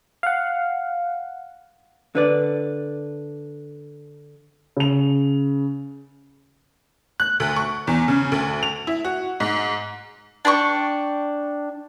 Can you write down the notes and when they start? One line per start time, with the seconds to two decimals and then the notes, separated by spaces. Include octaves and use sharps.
0.23 F5 F#5
2.15 D3 B4 D5
4.77 C#3 F7
7.20 F#6
7.40 D2
7.56 C#6
7.87 E2
8.08 C#3
8.32 D2
8.63 F7
8.87 E4
9.05 F#4
9.40 G#2
10.45 D4 G5 B5 C#6